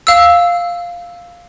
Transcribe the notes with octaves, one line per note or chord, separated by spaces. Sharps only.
F5 E6